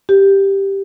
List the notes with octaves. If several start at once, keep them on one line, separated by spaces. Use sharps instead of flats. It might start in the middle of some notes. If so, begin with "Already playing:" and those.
G4